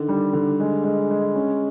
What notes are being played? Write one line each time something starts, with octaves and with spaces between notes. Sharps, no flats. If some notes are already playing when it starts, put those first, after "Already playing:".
Already playing: D3 D#3
G3
D3
G#3
G#3
G#3
C#4